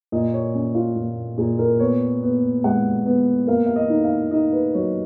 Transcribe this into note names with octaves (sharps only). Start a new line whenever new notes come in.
A#2 D#5
C#5
C#4
F4
A#2
A#2 G#4
A#4
B3 C#5
B3
G#3 F#5
B3
A#3 F5
F5
D#5
D#4
F5
D#4 D#5
B4
F#3 C#5